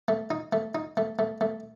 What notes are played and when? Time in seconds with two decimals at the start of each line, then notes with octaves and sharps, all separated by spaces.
0.08 A3
0.31 D#4
0.53 A3
0.75 D#4
0.97 A3
1.19 A3
1.41 A3